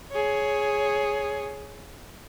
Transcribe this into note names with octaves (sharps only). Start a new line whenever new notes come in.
G#4 C#5